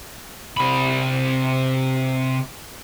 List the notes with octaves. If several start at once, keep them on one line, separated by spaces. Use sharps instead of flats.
C3 B5